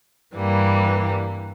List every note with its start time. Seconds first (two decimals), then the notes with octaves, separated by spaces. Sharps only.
0.34 G2 E3 G3 A#3